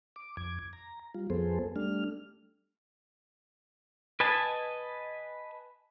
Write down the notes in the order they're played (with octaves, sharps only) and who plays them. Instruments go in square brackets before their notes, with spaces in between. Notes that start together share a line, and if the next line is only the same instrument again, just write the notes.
[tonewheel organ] D6
F2 D6 G#6
A#5
G3 F4
F2 F3 B3 G#4 A4 C5
G3 A3 D4 F6
[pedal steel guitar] B4 D#5 G#5 A5